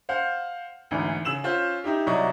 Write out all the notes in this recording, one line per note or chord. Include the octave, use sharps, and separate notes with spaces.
C5 F5 F#5
G#1 D2 E3
C#3 E6 E7 F#7
C#4 F4 C5
D#4 E4 G4
C2 F#3 E4 D5 D#5 C#6